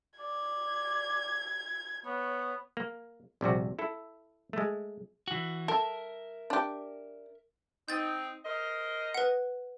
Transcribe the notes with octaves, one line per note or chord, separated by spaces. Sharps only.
D5 G#6
B3 C#5
A#3
A#1 C3 G3 F#4
E4 A4
G#3 A3
E3 F#4
A4 A#4 E5
D4 G4
C4 D#4 G6 A6
A#4 C5 D#5
B4 F#5